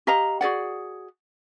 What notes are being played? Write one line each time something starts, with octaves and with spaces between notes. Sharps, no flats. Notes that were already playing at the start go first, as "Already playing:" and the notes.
G4 D#5 F5 A#5
F#4 G#4 D5 F#5